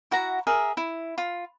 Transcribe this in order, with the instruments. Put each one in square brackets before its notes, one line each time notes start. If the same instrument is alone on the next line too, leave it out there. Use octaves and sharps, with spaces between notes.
[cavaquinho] E4 F#4 F#5 A#5
G#4 A#4 E5
E4
F4